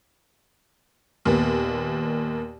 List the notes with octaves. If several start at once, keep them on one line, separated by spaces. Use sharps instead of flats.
D#2 A#2 B3